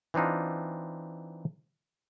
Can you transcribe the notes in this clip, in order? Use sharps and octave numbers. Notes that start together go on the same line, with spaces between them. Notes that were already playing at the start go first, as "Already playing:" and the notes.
E3 C4 D4 D#4 F4